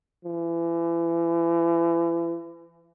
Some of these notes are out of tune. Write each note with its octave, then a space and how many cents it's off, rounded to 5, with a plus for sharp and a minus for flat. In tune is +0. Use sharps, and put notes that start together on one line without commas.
E3 +35